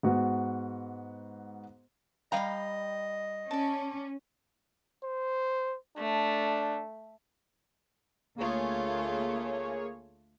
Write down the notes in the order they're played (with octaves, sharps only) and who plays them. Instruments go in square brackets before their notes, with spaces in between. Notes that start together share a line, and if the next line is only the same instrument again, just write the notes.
[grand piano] G#2 B3 F#4
[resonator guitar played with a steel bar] G3 F5 A#5 [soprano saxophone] D#5 [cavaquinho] G5 B5
[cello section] C#4 [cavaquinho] D5 A5
[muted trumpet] C5
[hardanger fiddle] A3 [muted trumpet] D4
[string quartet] D2 A3 F4 [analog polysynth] A#3 G#4 C#5